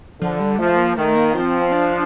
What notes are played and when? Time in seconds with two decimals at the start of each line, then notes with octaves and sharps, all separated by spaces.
0.21 D3 F3
0.40 G3
0.58 F3 A3
0.77 A#3
0.96 D#3 A3
1.16 A#3
1.33 F3 C4
1.72 D4